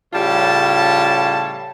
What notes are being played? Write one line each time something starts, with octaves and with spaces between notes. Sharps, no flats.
A2 C#3 G3 F4 C#5 A5